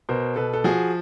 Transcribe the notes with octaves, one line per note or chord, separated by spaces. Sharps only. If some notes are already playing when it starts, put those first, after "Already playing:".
B2 A#4 C5
B2 A4 B4
A4
F3 F#4 G#4